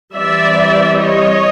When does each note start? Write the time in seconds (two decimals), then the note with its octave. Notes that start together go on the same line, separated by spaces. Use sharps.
0.16 E3 G3 C4 D5 E5
1.00 C#5 D#5